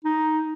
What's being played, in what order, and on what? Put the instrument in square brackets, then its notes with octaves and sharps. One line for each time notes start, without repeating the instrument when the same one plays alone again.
[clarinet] D#4